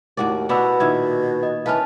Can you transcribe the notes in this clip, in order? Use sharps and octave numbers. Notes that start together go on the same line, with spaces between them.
D#2 A2 F#4 D5
B2 B3 D4 F#4 B4 B5 E6
A#2 D#3 E4 G#6
D#5
E3 C#4 A#4 B4 F5 A5 F6